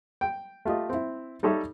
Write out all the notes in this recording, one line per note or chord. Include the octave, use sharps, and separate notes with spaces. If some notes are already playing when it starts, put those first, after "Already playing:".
G5
A3 F4 G4 D#5
C4 E4
G3 D#4 A4 C#5 E5